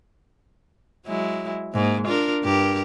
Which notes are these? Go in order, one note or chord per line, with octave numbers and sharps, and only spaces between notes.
F#3 G#3 E4
G#2 A#3
D4 F4 A#4
G2 G4 A#4